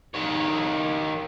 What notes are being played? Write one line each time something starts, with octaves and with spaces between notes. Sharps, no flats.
D#3 C#5